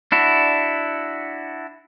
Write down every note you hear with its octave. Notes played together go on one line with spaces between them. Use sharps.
D4 E4 F#4